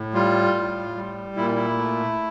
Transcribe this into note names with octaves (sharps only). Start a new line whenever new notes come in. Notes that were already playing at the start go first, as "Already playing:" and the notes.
Already playing: A2
G3 F4
A2
G3
A#2 E4
E4
A3